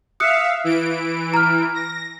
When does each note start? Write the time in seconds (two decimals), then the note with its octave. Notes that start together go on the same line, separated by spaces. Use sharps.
0.20 E5 F5 D#6 F#6 C#7
0.64 E3 D7
1.34 A#5 F6
1.74 A#6